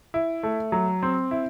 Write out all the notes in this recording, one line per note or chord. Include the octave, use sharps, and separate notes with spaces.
E4
A3
F#3
C4
E4